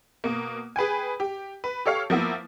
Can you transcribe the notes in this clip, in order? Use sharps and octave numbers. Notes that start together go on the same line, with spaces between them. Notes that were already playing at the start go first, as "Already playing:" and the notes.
B2 A#3
G#4 B4 G5 G#5
G4
B4
G4 A4 C#5 F5
F3 A#3 B3 E4